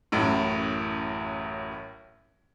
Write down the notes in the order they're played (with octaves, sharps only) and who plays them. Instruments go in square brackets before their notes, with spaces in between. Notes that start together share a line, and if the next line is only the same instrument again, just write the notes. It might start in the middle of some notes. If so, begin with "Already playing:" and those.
[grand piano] A1 F#2 A2